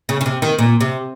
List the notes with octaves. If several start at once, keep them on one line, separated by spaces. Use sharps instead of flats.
C#3
C#3
C3
D#3
A#2
C3